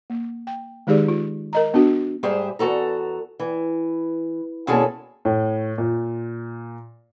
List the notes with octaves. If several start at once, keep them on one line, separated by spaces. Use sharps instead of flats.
A#3
G5
D#3 G#3 D#4 G4 G#4 D5
F4
A#4 D#5 A#5
B3 D4 F#4
G#2 G3 G4 G#4 C5 E5
E2 F#4 A4 A#5
E3
D#2 B2 C#4 E4 G#4 A4
A2
A#2